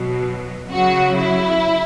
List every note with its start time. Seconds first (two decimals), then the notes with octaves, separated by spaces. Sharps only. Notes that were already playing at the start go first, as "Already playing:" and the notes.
Already playing: B2 F#3
0.70 C#3 F#3 F#4
1.18 E4